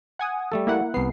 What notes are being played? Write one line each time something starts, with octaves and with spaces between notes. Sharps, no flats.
F#5 G#5 D#6
G3 A3 A4
A#3 E4 F#5
C2 B3 C7